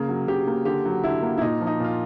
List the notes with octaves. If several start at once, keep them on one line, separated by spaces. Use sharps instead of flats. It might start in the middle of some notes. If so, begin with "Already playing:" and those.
Already playing: C#3 A#3
F#3
C#3 G4
A#3
D3 G4
F#3
D3 E4
A#3
E4
A#2 D#4
F3
D#4
A#2 F4